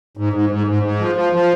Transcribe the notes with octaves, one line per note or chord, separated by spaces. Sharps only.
G#2
G#2
G#2
G#2
G#2
F3
F3
F3